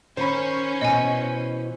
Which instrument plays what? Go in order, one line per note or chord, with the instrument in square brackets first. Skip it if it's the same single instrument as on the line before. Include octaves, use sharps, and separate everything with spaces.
[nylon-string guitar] D#3 [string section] C#4 [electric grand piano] C5 B5
[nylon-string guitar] B2 E3 [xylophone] D#5 G#5